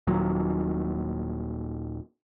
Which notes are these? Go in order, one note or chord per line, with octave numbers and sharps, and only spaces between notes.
D#1 D#2 A#2 F#3